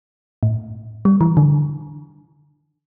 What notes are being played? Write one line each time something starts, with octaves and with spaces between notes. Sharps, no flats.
A2
G3
E3
D3